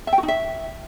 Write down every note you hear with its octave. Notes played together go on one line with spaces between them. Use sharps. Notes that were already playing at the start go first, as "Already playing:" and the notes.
E5
G5
F#4
D#4
E5